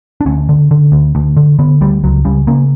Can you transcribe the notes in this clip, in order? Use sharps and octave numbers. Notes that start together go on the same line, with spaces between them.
D4
D2 C#4
D3
D3
D2
D2
D3
D3 B3
D2 G3
C#2 F#3
C#3 G3
C#3 A#3